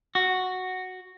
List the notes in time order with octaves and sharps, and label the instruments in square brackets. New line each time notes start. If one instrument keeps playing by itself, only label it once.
[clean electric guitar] F#4